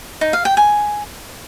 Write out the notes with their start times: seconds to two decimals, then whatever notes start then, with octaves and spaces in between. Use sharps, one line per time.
0.21 D#4
0.33 F5
0.45 G5
0.57 G#5